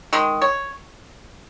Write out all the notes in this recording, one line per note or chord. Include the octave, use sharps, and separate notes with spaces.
D#3 G#3
C#5